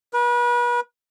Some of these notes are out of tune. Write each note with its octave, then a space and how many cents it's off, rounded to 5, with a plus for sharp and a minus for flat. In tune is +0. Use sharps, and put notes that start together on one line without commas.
B4 -35